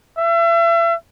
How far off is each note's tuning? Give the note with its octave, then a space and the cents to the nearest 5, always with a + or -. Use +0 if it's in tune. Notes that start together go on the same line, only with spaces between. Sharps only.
E5 +35